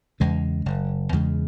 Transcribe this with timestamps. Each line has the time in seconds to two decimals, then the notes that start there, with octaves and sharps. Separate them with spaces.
0.20 E2 C#3 G#3
0.66 F#1
1.12 E2 C#3 G#3